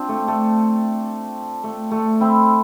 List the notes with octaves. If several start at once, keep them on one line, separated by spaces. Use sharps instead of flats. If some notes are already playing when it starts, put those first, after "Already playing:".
Already playing: C4 D4 F4
A3
A3
A3
A3
C4 E4